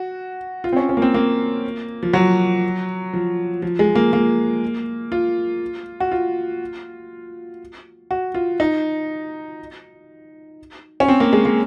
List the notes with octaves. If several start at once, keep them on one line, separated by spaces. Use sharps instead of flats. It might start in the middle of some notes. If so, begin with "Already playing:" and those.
Already playing: F#4
F4
C4
C#4
C#4
A#3
C4
A#3
F3
F#3
F3
F3
G#3
A#3
A#3
F4
F#4
F4
F#4
F4
D#4
C#4
C4
A#3
G#3
A#3